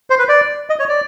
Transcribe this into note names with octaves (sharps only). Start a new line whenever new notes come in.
C5
B4
D5
D#5
C#5
D5